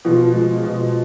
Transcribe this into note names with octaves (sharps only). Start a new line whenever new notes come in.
B2 F3
G#3
B2